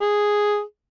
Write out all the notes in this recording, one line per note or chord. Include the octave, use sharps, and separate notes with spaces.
G#4